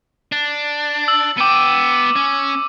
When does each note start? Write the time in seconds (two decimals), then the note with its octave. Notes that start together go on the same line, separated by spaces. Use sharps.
0.32 D4
1.08 E6 F#7
1.38 B3 G5 D6 D#7
2.16 C#4